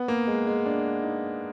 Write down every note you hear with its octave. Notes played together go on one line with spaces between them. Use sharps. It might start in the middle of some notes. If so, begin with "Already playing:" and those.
Already playing: B3
A#3
G#3
G#3
D4
D#4